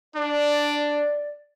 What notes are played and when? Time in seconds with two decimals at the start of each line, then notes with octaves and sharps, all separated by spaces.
0.16 D4 D5